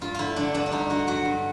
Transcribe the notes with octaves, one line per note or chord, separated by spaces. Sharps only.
G2 F4
D3 E4 F4
F#3 D4
G2 D4
D4
G2 D#4
D3 F#4
F#3 F#4
G2